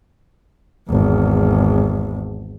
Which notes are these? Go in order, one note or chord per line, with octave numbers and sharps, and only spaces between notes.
G#1 E2